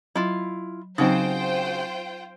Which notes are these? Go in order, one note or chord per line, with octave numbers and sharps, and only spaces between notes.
F#3 E4 F4
C#3 F#3 C4 D#4 F4 F#4 C5 G5